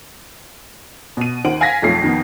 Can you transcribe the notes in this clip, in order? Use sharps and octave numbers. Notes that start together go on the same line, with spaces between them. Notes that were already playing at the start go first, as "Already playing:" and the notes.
B2 D#7
D#2 D#3 C5 F#5 D7 F#7
F5 G#5 G#6 A#6 B6
B1 F2 A3 F4 C7
F2 D#3 B3